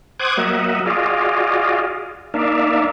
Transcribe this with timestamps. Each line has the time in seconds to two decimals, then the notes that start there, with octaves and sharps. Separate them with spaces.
0.20 C5 F#5 D6 D#6 F#6 G#6
0.37 F#3 A#3 D#5 E5 F#5
0.86 F4 F#4 G#4 D5 D#5 F5
2.34 A#3 D4 D#4 D5 E5 F5